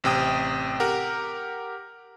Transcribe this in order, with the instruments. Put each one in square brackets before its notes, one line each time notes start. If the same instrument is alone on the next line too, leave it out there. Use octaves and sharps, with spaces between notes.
[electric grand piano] A1 C3 G5 D#6
G4 A#4 F#5